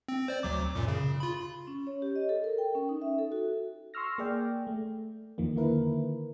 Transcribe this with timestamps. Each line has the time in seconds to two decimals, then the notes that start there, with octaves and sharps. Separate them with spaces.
0.08 C4
0.28 C5 D5
0.43 D2 F#3 D6
0.75 F#2 A#2
0.88 C#3
1.20 F4 B5
1.67 C#4
1.87 C#5
2.02 G4
2.16 D#5
2.29 A4
2.44 A#4
2.58 G5
2.75 C#4
2.89 D#4
3.02 E5
3.19 A4
3.32 F#4
3.94 C6 C#6 E6 F6 A#6
4.18 A#3 G#4 D5 G5
4.67 A3
5.38 E2 D#3 F3 A#3
5.56 D3 D#3 A#3 E4 A#4 B4